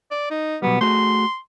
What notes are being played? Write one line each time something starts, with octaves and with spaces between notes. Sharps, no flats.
D5
D#4
B2 F#3 G3 B3
A3 F#4 G#4 C6